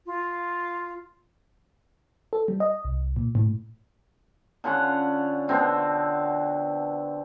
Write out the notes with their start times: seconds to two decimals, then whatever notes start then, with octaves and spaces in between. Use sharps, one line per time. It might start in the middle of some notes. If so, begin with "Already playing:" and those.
0.06 F4
2.33 A4
2.48 G3
2.60 D#5
2.85 C2
3.16 A#2
3.35 A2
4.64 D3 C#4 F4 F#5
5.48 B2 D3 C4 F#4